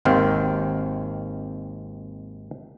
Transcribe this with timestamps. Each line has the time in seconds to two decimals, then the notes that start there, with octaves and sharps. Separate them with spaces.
0.05 G#1 D#2 D#3 C4 F5 G5